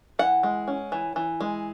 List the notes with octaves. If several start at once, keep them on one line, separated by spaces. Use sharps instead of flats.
E3 F#5
G#3
C#4
E3
E3
G#3